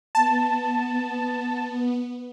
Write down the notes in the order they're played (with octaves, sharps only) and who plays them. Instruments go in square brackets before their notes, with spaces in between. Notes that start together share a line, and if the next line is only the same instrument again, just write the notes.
[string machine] B3 [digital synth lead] A5